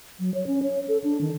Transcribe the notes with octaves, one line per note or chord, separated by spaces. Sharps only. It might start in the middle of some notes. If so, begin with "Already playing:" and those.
F#3
C#5
C#4
C#5
A4
D4
D#3